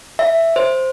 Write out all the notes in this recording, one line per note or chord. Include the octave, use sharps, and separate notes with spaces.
E5
C5